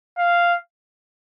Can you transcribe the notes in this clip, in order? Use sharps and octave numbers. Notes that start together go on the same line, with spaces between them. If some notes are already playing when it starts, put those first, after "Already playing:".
F5